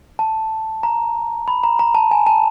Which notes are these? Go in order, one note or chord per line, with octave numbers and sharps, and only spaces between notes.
A5
A#5
B5
A#5
A#5
A5
G#5
A5